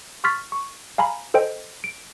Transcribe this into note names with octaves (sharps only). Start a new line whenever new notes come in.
C6 C#6 F6 A6 B6
C#6
F5 G#5 A#5 B5
A4 C5 D#5 G5
D7